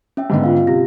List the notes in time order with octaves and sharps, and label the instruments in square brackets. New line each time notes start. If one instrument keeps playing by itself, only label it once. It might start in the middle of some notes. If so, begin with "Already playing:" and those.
[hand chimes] C#4 E5 G5
[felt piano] G#2 D3 B3
[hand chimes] F4 F5
[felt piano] C3 [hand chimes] A#6